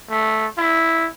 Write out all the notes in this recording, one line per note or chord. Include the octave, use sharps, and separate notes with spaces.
A3
E4